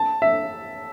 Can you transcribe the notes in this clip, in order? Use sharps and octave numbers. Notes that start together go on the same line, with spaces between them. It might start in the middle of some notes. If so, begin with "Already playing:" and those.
Already playing: A5
E5